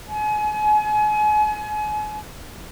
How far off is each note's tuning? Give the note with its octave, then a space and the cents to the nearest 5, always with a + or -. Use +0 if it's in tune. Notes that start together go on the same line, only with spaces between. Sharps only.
G#5 +35